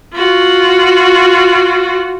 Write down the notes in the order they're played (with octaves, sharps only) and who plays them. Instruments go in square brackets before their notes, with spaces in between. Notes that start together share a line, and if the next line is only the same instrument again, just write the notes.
[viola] F4 F#4